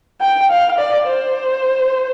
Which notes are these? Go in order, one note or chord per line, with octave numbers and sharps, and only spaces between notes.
G5
F5
D5
C5